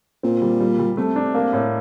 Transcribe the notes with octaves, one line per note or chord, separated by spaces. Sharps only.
A#2 C4
G3
G3
G3
C3 A3
D4
A#3
A2